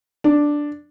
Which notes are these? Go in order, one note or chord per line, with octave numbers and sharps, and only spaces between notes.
D4